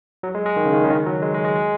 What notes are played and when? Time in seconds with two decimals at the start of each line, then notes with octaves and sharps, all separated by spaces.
0.23 F#3
0.35 G#3
0.46 G#3
0.56 D#3
0.65 C#3
0.73 D#3
0.84 C#3
0.90 D#3
1.06 F#3
1.22 G#3
1.34 G#3
1.45 G#3
1.56 G#3